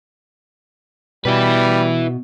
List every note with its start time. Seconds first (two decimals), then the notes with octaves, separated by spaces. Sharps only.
1.25 B2 G3 E4 B4